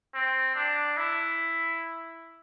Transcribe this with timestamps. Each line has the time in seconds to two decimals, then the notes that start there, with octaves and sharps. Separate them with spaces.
0.14 C4
0.56 D4
0.97 E4